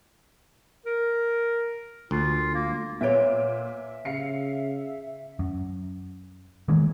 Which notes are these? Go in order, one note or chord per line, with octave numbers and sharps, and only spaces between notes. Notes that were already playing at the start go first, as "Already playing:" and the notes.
A#4
D2 F4
A#3
A#2 B4 C#5 E5 D7
C#3 F5 C7 C#7
F#2
D#3 E3 G#3 A#3